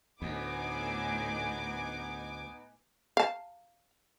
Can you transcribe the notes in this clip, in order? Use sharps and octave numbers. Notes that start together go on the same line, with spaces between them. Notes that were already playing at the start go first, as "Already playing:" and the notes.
D2 A2 B3 D#4 G#5 D6
F5 A5